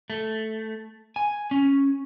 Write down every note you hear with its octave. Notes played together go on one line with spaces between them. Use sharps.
A3
G#5
C#4